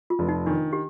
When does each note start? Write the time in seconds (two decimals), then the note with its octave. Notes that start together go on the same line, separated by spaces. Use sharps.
0.10 F4
0.19 F1
0.28 D#4
0.46 D#3 D4
0.73 G4